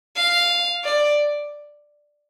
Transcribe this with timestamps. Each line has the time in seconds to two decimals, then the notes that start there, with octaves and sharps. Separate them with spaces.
0.16 F5
0.84 D5